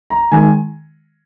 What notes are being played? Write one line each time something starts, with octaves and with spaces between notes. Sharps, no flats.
A#5
D#3 G#3 G#5